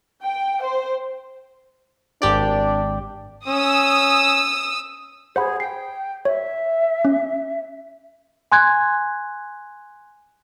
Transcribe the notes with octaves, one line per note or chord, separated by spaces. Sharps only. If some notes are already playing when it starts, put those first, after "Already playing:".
G5
C5
G#1 D4 G4 D5
C#4 D#6 E6
G#4 C5 F#5 B5
G5 C7
C#5 E5
C#4
G#5 C6 F#6 G#6